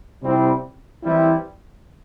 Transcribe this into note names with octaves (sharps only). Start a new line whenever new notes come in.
C3 G3 C4 E4
E3 G3 C4 E4